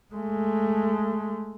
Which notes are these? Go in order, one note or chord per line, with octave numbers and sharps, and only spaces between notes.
G#3 A3